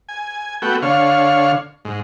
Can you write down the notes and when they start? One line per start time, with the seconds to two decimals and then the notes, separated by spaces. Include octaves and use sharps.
0.09 G#5
0.62 A3 B3 F#4 G5
0.82 D3 C#5 F5
1.85 G#2